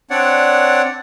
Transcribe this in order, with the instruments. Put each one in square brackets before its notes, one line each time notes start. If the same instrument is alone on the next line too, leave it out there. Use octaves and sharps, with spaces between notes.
[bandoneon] C4 D4 C#5 D5 F#5